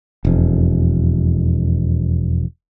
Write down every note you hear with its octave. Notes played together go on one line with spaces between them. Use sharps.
E1 F2